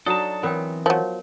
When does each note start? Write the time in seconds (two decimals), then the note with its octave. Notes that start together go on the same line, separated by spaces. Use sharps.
0.06 F#3 D4 D#4 A4 A5 D#6
0.43 E3 B3 C4 A#4 C#5 G5
0.86 F3 F#3 A#4 C#5